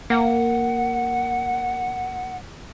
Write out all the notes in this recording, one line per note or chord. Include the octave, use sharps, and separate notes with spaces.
A#3 F#5